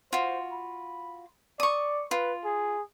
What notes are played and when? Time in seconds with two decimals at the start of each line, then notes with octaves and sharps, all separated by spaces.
0.13 F4 F#4 C5
0.52 B5
1.60 D5 C#6 D#6
2.11 F4 B4
2.45 G#4